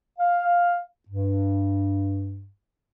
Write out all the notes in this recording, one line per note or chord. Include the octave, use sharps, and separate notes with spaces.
F5
G2